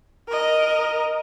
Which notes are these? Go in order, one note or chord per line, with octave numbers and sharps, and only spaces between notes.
A#4 D#5